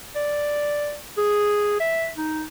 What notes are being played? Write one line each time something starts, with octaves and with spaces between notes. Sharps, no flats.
D5
G#4
E5
D#4